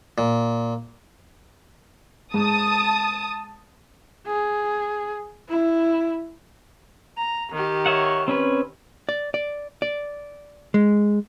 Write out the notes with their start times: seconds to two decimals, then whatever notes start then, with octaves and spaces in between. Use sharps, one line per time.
0.18 A#2
2.34 G#2 A5 D#6
4.26 G#4
5.48 E4
7.17 A#5
7.52 D#3 G4
7.86 C#5 E5 F#5
8.28 C4 C#4 B4
9.09 D5
9.34 D5
9.82 D5
10.74 G#3